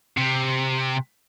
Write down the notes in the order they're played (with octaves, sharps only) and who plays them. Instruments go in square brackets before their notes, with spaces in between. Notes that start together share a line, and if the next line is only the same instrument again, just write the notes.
[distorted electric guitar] C3